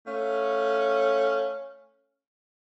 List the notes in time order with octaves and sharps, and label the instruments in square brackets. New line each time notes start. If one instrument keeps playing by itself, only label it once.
[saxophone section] A3 C#4 F5